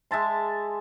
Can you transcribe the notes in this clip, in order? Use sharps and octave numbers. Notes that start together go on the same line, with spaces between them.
G#3 E5 A5 C6